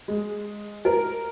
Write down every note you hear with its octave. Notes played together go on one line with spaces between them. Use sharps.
G#3
A#4